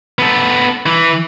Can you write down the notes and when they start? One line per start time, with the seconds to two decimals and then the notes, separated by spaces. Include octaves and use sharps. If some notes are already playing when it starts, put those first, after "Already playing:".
0.19 B3 A4
0.86 E3